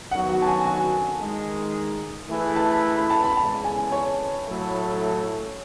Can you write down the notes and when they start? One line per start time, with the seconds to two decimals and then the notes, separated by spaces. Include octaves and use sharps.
0.11 D#3 F#3 B3 F#4 F#5
0.29 F#5
0.42 A5
0.47 G#5
0.66 G#5
1.20 D#3 G#3 D#4
2.29 E3 A3 E4 G#4 B4
2.56 A5
2.96 B5
3.10 A5
3.24 B5
3.37 E2 C#3 E3 G#3 A5
3.64 G#5
3.92 C#5
4.47 A2 F#3 A3 E4 A4